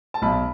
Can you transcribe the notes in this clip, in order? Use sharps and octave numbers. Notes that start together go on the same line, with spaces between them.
A5
B1 B5